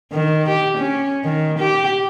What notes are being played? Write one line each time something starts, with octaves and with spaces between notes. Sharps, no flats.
D#3
G4
C#4
D#3
G4